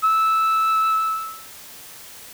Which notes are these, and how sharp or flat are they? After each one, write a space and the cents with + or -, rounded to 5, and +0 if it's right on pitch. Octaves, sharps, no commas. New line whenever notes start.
E6 -10